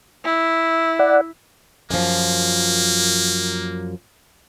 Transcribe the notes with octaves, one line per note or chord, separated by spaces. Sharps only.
E4
D5 F#5
F#2 F3 A#3